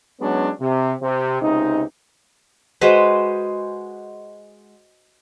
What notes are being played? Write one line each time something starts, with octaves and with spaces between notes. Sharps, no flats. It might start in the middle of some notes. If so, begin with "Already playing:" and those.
F#3 G#3 B3 C#4 D4
C3
C3
C#2 C3 D#4
G#3 F#4 B4 C5